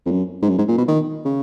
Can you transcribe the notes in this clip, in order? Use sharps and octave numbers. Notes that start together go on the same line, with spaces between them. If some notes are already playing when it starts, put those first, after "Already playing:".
F2
F#2
G#2
F#2
G#2
A#2
B2
D#3
C#3